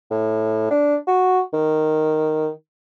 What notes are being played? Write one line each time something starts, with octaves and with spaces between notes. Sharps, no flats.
A2
D4
F#4
D#3